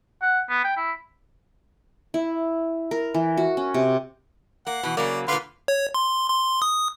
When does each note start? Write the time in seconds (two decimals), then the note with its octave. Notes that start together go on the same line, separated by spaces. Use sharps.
0.22 F#5
0.50 B3
0.64 G5
0.77 E4
2.14 E4
2.91 A#4
3.14 E3
3.37 F#4
3.57 C#4
3.74 C3
4.67 A#3 F#5
4.83 B2 E3
4.97 C#3 F#3 A#3 D5
5.28 A#2 D3 B4 F5 C6
5.68 C#5
5.94 C6
6.29 C6
6.62 D#6